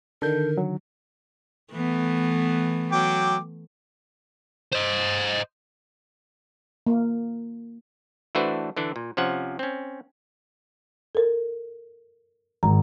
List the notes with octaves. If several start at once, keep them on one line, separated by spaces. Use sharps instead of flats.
D3 D#3 A4 A#4 G6
F#3
E3 A3 B3
F#3 G5 D6
C5 D#5
A#3
E3 A3 D4 F#4 B4 C5
D3 E3 D4
A#2
C3 F3 C#4 F#5
C4 C#4
A4 A#4
G#1 A#5